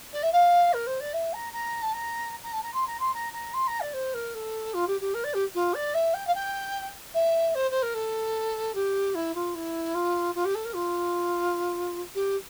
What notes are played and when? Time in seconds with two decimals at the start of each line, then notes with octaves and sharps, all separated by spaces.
0.13 D5
0.23 E5
0.33 F5
0.73 A#4
0.87 C5
1.00 D5
1.14 E5
1.33 A#5
1.53 A#5
1.82 A5
1.93 A#5
2.44 A#5
2.53 A5
2.63 A#5
2.74 C6
2.87 A#5
3.00 C6
3.14 A#5
3.33 A#5
3.54 C6
3.67 A#5
3.81 D5
3.94 C5
4.14 A#4
4.34 A4
4.74 F4
4.88 G4
5.01 G4
5.14 A#4
5.24 D5
5.34 G4
5.55 F4
5.74 D5
5.94 E5
6.14 G5
6.27 F5
6.35 G5
7.14 E5
7.55 C5
7.71 C5
7.82 A#4
7.94 A4
8.75 G4
9.15 E4
9.35 F4
9.55 E4
9.95 F4
10.35 F4
10.45 G4
10.55 A4
10.65 A#4
10.75 F4
12.15 G4